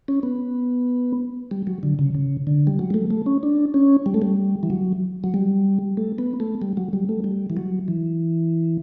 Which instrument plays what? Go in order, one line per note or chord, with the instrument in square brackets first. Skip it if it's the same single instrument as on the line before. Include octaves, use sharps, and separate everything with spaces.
[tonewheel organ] C#4
B3
G3
F#3
D3
C#3
C#3
D3
G3
F#3
G3
A3
A3
C#4
D4
C#4
G3
A3
G3
E3
F#3
F#3
G3
A3
B3
A3
G3
F#3
G3
A3
G3
E3
F#3
E3